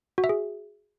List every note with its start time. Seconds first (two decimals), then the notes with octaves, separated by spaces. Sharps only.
0.18 F#4
0.24 E5
0.29 G#4